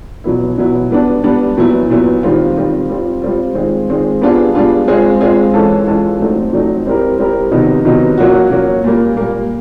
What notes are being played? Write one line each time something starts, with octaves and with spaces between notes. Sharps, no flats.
B2 F#3 B3 E4
B2 F#3 B3 E4
G3 B3 D4
G3 B3 D4
A#2 F#3 B3 E4
A#2 F#3 B3 E4
D#3 G3 C4 F4
D#3 G3 C4 F4
G3 C4 F4
G3 C4 F4
D#3 G#3 C4 F4 G#4
D#3 G#3 C4 F4 G#4
G3 B3 D4 F4 G#4
G3 B3 D4 F4 G#4
G#3 C4 F4 G#4
G#3 C4 F4 G#4
E3 G#3 C#4 F4 A4
E3 G#3 C#4 F4 A4
F#3 A3 C4 D#4
F#3 A3 C4 D#4
G3 C4 E4 G4 A#4
G3 C4 E4 G4 A#4
C3 D#3 F#3 B3 D#4
C3 D#3 F#3 B3 D#4
F#3 A#3 C#4 F#4
F#3 A#3 C#4 F#4
A#2 G3 A#3
A#2 G3 A#3